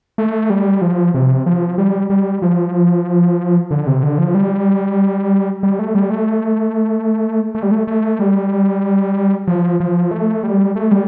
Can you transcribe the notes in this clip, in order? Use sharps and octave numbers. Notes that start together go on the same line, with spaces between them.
A3
G3
F3
C3
F3
G3
G3
F3
D3
C3
D3
F3
G3
G3
A3
G3
A3
A3
G3
A3
A3
G3
F3
F3
A3
G3
A3
G3